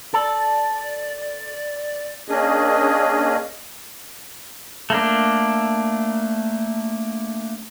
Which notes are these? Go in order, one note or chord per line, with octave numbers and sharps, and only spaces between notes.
A4 D5
A#3 C#4 D4 G#4 D#5
A3 A#3 D4